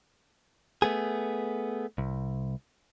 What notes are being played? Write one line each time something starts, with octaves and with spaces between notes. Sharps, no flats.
A3 B3 G#4
C2